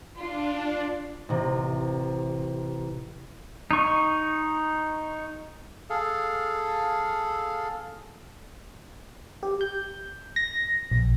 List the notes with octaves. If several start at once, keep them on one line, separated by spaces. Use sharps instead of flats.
D4 F4
A1 C3
D#4 C#6
G#4 A4 F5
G4
G6
A#6
A#1